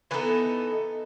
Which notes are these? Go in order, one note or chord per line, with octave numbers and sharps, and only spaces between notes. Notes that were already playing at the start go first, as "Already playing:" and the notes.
E3 B3 D#4 A4